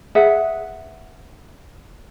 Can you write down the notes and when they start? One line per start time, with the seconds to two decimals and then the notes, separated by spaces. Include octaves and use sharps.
0.15 G#4 B4 E5 F#5